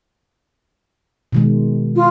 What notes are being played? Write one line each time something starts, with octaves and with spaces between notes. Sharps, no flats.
B2 D#3 G#3
F4